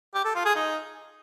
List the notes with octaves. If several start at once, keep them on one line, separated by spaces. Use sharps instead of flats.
G4
A4
F4
G#4
D#4